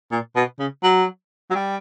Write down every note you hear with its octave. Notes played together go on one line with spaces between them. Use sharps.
A#2
B2
C#3
F#3
F#3
G3